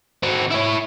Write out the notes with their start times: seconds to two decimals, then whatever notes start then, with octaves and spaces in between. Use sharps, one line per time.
0.23 C4 F#4
0.50 E4 C#5